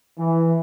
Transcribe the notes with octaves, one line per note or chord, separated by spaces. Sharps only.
E3